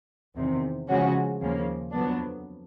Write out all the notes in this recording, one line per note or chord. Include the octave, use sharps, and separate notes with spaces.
E2 C3 D#3
C#3 F3 G#3 C#4 F#4
D#2 C#3 F3 A#3
F2 D3 F#3 B3 D4